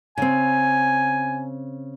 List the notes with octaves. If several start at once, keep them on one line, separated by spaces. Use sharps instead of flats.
C#3 C4 G#5